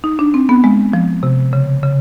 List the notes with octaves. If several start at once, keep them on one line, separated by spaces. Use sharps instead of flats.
D#4
D4
C4
B3
G#3
F3
C3
C#3
C#3